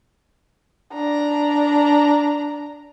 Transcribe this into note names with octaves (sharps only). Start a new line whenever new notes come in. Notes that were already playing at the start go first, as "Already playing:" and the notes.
D4 A#5